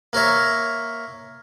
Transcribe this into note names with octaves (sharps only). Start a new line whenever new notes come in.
A#3 A#4 C#5 E5